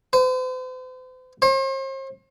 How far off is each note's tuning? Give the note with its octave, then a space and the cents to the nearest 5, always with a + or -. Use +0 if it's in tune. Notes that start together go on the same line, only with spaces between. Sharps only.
C5 -45
C5 +40